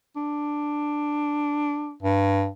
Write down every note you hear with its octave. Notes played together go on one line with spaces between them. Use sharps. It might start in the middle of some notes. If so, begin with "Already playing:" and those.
D4
G2